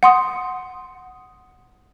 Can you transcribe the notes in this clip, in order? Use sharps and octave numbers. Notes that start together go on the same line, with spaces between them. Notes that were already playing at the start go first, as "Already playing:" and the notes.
F#5 C6 D#6